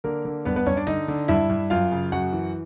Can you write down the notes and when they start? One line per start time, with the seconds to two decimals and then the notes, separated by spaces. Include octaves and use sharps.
0.04 D3 A#3 A#4
0.25 D3
0.45 G2 B3 B4
0.56 B3 B4
0.66 G2 C#4 C#5
0.77 D4 D5
0.87 D3 D#4 D#5
1.08 D3
1.28 G2 E4 E5
1.50 G2
1.70 F#2 F4 F5
1.91 C#3
2.12 F#2 F#4 F#5
2.33 E3